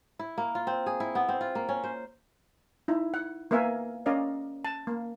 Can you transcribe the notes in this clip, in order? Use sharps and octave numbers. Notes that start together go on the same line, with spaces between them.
E4
A#3
F4
C4
G#4
E4
B3
C4
F4
A#3
C#4
C5
D#4 E4
F#5
A#3 B3 A#4 E5 F5 G#5
C#4 A#4 D5 D#5 F5
A5
A#3